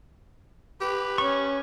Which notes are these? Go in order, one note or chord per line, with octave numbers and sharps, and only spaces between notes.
G4 B4
C#4 C#6